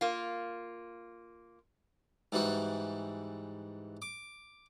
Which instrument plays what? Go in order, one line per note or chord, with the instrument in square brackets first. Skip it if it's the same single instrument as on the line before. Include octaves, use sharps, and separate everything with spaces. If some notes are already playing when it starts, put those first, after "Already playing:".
[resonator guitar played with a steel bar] A#3 F4
[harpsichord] G#2 E3 G3 F#4
D6